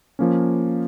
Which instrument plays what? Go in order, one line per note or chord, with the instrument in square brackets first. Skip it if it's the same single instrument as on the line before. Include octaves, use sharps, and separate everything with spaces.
[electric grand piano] F3 A#3 C#4